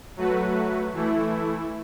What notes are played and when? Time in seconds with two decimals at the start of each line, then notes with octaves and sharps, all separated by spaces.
0.17 F#3 A3 F#4 B4
0.93 E3 A3 E4